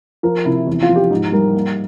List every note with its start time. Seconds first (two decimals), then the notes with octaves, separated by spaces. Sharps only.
0.23 F3 A#4
0.45 C3 E4
0.67 E2
0.82 F4
0.89 F3
0.96 G4
1.11 G#2
1.32 G3 A#4
1.55 A#3